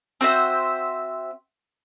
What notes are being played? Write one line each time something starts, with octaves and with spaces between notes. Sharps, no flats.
C4 F#4 C5 E5